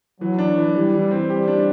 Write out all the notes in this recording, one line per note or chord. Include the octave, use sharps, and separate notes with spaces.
E3 F#3
D4
E3
E3 G3
E3
C4
G3 G4
D4